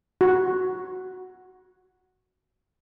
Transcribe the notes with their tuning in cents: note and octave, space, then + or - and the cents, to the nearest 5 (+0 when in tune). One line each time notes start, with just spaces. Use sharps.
F#4 +0 C6 +40